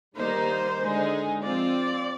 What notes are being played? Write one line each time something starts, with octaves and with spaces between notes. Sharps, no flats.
D#3 G3 A#3 D#4 C5
D3 G#3 D#4 G#4
F3 C4 F4 D5